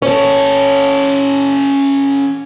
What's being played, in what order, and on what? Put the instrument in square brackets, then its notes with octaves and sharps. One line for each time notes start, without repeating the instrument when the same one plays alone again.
[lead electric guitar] C#4 A4 [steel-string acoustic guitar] C#5